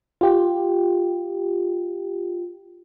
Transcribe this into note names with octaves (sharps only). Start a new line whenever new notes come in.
F4 G4